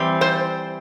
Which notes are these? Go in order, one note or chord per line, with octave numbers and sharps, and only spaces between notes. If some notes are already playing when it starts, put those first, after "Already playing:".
Already playing: E3 G3 C4
C5